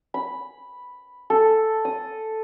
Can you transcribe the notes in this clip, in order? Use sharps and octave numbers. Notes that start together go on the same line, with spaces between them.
B5
A4
D#6